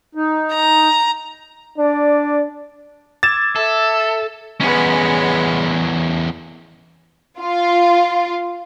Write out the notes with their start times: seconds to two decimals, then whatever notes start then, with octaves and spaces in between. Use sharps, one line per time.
0.15 D#4
0.54 A#5
1.78 D4 D5
3.23 D6 E6 G#6 A6 E7
3.56 A4 E5
4.61 E2 G#3 B3 C#4
7.41 F4